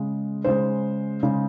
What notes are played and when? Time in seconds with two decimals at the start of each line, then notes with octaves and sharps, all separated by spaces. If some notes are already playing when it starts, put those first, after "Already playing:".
Already playing: C#3 G#3
0.44 C#3 G#3 C5
1.23 C#3 G#3